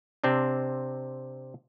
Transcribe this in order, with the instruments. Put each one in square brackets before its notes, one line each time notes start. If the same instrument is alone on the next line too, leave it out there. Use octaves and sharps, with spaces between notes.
[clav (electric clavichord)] C3 C4 D4